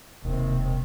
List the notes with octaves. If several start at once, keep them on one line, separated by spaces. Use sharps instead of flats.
E1 D#2 C3